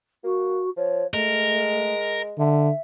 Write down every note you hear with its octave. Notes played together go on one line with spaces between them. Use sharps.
A#3 F#4
F3 C#5
G#3 A3 A#4
D3 E5